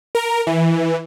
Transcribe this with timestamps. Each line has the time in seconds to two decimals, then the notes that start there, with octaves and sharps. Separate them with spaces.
0.15 A#4
0.47 E3